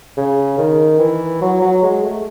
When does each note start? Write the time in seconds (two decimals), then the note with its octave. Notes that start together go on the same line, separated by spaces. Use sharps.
0.17 C#3
0.58 D#3
1.00 E3
1.41 F#3
1.61 F#3
1.83 G#3
2.03 A3